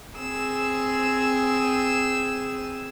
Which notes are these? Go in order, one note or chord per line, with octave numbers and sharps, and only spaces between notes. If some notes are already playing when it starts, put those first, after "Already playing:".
C4 G#4 E6